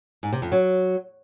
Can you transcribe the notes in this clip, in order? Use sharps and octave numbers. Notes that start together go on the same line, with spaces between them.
G#2
C3
F2
F#3